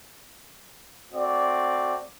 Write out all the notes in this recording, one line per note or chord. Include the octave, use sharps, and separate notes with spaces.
A3 C4 F#4 D5